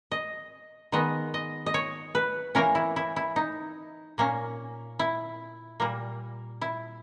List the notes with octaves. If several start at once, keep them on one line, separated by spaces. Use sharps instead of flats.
D#5
D#3 G#3 B3 D#5
D#5
D#5
C#5
B4
E3 A#3 C#4 A#4
E4
E4
E4
D#4
A#2 A#3 C#4
E4
A#2 G3 A#3
E4